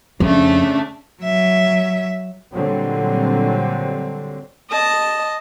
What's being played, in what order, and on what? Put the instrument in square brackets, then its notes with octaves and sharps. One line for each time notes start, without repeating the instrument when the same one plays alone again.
[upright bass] F2 [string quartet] C#3 A3 D4
[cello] F#3 E5
[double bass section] A#2 D3 F#3 G3 C4
[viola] D#5 A5